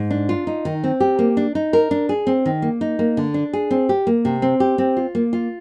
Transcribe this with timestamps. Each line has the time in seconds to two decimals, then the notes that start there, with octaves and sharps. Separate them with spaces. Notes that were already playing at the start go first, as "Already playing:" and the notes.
Already playing: G#2
0.10 D4
0.29 F4
0.47 D#4
0.65 D#3
0.84 C4
1.00 G4
1.19 A#3
1.37 D4
1.55 D#4
1.73 A#4
1.91 D4
2.09 G#4
2.27 C4
2.46 D#3
2.62 A#3
2.81 D#4
2.99 A#3
3.17 D3
3.34 D4
3.53 G#4
3.71 C4
3.89 G4
4.07 A#3
4.25 C3
4.42 C4
4.60 G4
4.78 C4
4.97 F4
5.15 A#3
5.33 F4